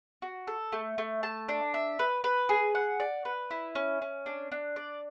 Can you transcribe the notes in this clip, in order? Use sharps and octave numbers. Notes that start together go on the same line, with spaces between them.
F#4
A4
A3
A3
A5
D4
E5
B4
B4
G#4
F#5
D5
B4
E4
C#4
C#4
D4
D4
D5